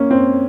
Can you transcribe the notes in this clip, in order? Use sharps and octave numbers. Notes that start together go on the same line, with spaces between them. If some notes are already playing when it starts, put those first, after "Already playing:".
Already playing: A#3 C#4
C4